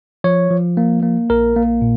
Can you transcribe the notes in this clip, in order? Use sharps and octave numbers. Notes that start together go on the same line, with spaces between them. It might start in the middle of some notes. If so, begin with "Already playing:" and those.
F3 C#5
F3
A#3
A#3
A#1 A#4
A#3
A#2